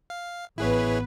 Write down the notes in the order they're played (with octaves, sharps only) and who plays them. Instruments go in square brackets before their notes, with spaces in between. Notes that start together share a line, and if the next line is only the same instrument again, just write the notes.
[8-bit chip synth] F5
[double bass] A1 B3 [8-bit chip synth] E4 G#4 C#5 [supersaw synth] B4